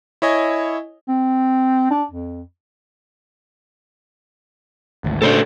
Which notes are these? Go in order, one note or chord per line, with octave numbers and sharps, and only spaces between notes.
E4 C#5 D#5 G#5
C4
D4
F2
G#1 D2
A2 C#3 D4 A4 C5 D5